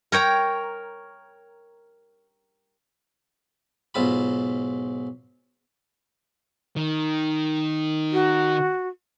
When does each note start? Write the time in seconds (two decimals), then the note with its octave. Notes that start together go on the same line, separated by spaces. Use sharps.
0.12 A#4 C#5 G5 A#5
3.94 B1 G#2 F4 B5
6.76 D#3
8.12 F#4